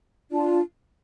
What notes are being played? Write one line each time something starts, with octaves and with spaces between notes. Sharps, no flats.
D4 F4 D5 A5